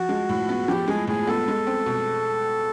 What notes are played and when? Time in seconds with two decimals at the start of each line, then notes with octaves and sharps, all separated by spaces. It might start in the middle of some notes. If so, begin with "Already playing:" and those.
Already playing: F3 F#4
0.09 G#3
0.29 A2
0.49 B3
0.68 F3 G4
0.88 G#3 G#4
1.07 A2 G#4
1.27 B3 A4
1.48 G#3
1.67 C4
1.86 B2